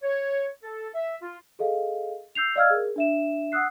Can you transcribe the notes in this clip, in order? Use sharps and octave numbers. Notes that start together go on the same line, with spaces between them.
C#5
A4
E5
F4
G#4 A4 D#5 F5
E6 G6 C7 F7
D5 D#5 F5 E6 F6 G#6
G#4 A#4
D4 E5 E7
F#5 D#6 E6 F#6 C7